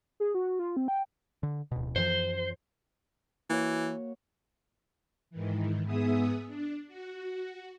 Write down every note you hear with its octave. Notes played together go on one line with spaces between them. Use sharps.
G#4
F#4
F4
C4
G5
D3
D1 B2
F#2 E3 F3 C5
E3 A#3 F#4 C#5
G#2 D#3 E3
G#2 B3 G#4 E5 D#6
D4
F#4